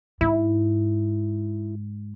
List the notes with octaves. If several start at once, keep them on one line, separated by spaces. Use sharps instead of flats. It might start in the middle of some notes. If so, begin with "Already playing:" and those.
G#2 E4